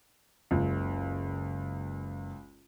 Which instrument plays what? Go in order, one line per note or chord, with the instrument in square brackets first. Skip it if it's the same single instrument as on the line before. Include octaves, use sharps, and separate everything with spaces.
[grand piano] F#1 [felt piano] C#2